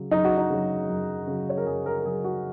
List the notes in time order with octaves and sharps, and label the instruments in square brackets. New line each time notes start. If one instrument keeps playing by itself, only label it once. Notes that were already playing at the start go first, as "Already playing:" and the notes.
Already playing: [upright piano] C#3 F#3
F#2 D#4
F#4
D#4
C#3 F#3
F#2
C#3 F#3
C#5
A#4
F#2 G#4
A#4
A#4
C#3 F#3 G#4
F#4